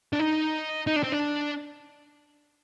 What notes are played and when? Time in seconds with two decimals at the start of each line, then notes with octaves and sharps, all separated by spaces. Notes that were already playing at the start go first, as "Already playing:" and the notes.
0.13 D4
0.19 D#4
0.87 D#4
0.96 D4
1.03 C4
1.12 D4